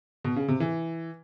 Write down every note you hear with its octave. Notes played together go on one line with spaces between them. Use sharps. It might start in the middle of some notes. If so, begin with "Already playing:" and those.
B2
C#3
C3
E3